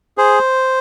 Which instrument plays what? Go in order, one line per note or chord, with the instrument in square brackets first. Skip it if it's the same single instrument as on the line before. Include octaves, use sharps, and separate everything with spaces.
[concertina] G#4 C5